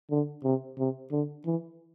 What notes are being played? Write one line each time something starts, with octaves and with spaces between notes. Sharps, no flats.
D3
C3
C3
D3
E3